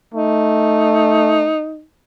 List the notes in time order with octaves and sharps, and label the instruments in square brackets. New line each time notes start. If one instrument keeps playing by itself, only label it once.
[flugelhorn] A3 [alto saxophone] D#4